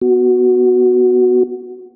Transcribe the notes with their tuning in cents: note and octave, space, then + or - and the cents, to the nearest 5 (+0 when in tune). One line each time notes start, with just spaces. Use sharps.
B3 +0 F#4 +0